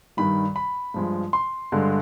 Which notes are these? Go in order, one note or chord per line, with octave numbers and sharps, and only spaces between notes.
G2 D#3 G3 B5
B5
G2 F3 G#3
C6
G2 D3 G#3